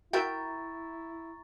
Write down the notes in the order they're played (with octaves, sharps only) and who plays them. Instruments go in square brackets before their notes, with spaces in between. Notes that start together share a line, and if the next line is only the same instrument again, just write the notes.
[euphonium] E4 [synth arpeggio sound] F#4 [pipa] A#4 E5 G5 [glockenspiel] A#5 C#6 A6